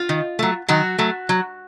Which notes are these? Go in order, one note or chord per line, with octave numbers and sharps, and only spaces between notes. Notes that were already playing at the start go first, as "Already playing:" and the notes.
Already playing: F4
D#3
F#3 A3
D#3 F#3 F#4
F#3 A3
F#3